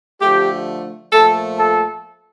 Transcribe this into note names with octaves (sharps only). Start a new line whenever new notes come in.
D3 F3 A3 G4
A#2 F3 A3 A4
A4